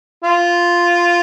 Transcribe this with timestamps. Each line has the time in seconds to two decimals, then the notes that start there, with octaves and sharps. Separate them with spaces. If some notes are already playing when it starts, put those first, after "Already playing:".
0.24 F4